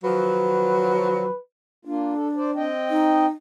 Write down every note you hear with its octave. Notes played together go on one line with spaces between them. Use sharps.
D#3 F3 F#3 B4
A#3 D4 F4
A4
C5 D5
C4 D#5 G5
D#4